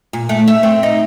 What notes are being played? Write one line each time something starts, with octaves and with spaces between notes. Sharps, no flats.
A#2
A3
E5
C4
D#4